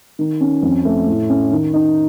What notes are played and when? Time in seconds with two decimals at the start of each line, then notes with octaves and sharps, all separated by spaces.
0.19 D#3
0.41 C#4
0.63 F2
0.85 A3
1.07 A2
1.30 C#4
1.52 D#3
1.74 D#4